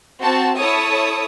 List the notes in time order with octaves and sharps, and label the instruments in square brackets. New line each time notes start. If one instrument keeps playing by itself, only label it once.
[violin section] C4 F#4 A5
E4 A4 C#5 D#6